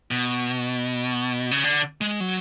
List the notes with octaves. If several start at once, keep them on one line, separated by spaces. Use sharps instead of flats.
B2
C#3
D3
G#3
F#3